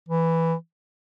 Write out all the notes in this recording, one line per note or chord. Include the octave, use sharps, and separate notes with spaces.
E3